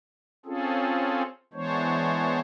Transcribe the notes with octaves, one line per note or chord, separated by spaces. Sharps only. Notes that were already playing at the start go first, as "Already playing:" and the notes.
C4 C#4 F4 G#4 A4
E3 G#3 B3 D4 C5 C#5